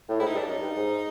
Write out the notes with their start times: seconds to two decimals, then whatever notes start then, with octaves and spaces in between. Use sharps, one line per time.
0.09 A2
0.20 G#2 E4
0.27 D#4
0.34 G2
0.36 D4
0.44 F#2 D#4
0.62 G2
0.76 G#2